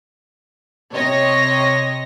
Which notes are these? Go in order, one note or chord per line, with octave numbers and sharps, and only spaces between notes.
C3 C#5 D#5 A#6